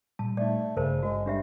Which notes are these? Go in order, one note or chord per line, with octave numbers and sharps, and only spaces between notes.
A#2 G3 A5
A3 D#4 D5
G#1 G2 C#3 A#4 C5 A5
G#3 F#4
G3 D4 G4 E5